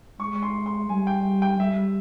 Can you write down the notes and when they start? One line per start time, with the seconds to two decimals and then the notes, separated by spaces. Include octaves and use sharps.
0.20 G#3 C#6
0.43 C6
0.66 C6
0.89 G3 G#5
1.07 G5
1.42 G5
1.60 G3 E5